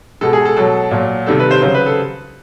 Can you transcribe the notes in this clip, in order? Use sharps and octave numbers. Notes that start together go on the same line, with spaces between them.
B2 G#3 A4
G#4
A4
B2 F#3 A4
A#2 F#3
C3 D#3 G3 A4
B4
C5
C#3 F#3 C5
B4
A4